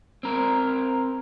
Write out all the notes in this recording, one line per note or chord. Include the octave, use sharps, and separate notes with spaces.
C4 A#4